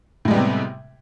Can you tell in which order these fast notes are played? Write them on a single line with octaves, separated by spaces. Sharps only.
A2 G#3 G3 B3 C3